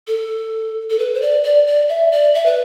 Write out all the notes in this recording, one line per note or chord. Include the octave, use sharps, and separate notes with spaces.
A4
A4
B4
C5
D5
D5
D5
E5
D5
E5
B4